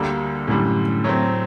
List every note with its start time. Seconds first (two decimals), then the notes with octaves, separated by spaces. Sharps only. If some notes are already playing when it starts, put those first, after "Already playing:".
Already playing: D2 D3 G3 A#3
0.47 F#2 A2 D3 G3
1.04 F#3 A3 C4